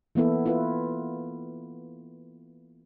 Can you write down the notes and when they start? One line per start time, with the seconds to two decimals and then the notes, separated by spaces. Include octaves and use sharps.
0.15 E3 A#3 B3 E4 A4
0.46 E4 F4 B4